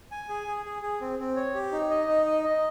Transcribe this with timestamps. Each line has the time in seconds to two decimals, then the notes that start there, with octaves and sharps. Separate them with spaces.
0.11 G#5
0.29 G#4
0.47 G#4
0.65 G#4
0.82 G#4
1.01 C4
1.19 C4
1.36 C#5
1.55 G4
1.72 D#4
1.90 D#5
2.07 D#4
2.26 D#5
2.44 D#5